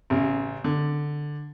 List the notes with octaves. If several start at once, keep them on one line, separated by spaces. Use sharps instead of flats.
A1 C#3
D3